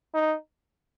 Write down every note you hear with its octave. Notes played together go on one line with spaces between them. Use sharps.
D#4